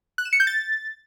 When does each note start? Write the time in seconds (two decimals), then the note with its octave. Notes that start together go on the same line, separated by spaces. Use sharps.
0.18 F#6
0.25 E7
0.33 C#7
0.40 G6
0.47 A6